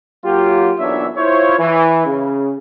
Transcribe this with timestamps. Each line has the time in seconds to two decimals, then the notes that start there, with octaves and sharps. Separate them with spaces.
0.24 F#3 A#3 F4 G4
0.79 B1 A#2 E3 D4 C#5 E5
1.17 E4 F4 C5 C#5
1.59 E3
2.06 C#3